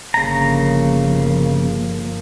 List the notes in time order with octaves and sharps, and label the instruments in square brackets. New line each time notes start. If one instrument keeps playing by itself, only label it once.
[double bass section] G1 F3 A#3 [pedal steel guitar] C#3 A#5